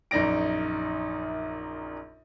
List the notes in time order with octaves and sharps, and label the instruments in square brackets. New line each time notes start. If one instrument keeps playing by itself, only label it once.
[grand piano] A#1 F#2 D#4 D5 A#6 D7